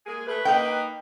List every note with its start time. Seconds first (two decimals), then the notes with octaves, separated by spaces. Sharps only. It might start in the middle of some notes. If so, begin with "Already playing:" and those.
0.06 G#3 A#3 G#4
0.27 A3 B4
0.45 A#3 D#4 B4 G5